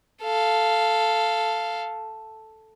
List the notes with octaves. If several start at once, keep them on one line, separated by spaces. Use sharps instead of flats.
A4 F5